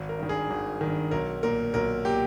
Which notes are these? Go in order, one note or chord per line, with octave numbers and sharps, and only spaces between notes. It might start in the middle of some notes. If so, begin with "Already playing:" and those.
Already playing: G#1
A#4
G2 D#3
G#4
G#1
G2 D#3
B1 A#4
A#2 A#4
B1 A#4
A#2 G4